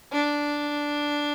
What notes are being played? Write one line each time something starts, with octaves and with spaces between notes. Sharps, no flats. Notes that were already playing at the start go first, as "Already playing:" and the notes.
D4